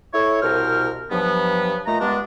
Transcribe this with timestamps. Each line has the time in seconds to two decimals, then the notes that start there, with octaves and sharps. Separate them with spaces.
0.14 E4 A4 C#5
0.42 C2 B2 A#4 C5 F6
1.11 G2 F3 F#3 B3
1.86 A#2 A3 D#5 A#5
2.01 G2 G#3 B3 D4